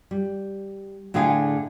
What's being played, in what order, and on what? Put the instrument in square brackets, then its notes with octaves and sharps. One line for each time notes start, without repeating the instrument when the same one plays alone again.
[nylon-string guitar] G3
A2 D3 G#4 F5 G5 G#5